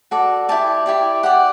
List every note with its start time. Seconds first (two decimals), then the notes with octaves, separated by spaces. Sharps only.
0.11 F#4 A4 D5
0.49 E4 G4 D5 A5
0.86 E4 G4 D5
1.23 G4 D5 F#5